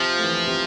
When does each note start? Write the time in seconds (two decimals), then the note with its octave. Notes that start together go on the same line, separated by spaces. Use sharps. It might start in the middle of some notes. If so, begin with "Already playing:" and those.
Already playing: C3 F3
0.18 A3
0.24 E3
0.47 C3